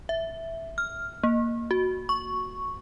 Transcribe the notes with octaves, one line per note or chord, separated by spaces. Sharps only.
E5
F6
A#3
F#4
C#6